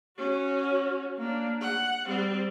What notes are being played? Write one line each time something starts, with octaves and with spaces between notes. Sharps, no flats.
C#4 F#4
A#3 D4
F#5
G3 C4